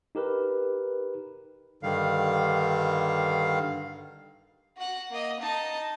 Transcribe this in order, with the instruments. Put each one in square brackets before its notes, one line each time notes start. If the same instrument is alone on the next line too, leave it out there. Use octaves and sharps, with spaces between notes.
[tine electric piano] D#4 G4 A#4 B4
[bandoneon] G2 D3 D#3 G3 F5
[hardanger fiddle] F#4 F#5
A#3 D#5
D#4 A5